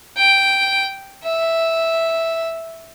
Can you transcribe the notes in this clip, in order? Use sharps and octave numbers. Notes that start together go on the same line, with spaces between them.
G5
E5